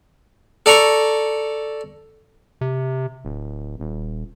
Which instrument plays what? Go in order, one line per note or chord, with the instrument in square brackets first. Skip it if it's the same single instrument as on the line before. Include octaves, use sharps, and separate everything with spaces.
[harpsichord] A4 D5 A#5 C#6
[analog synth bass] C3
D1
D#1